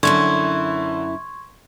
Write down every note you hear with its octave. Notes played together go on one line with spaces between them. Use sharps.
F#2 D3 C#4 E4 C6 C#6 G#6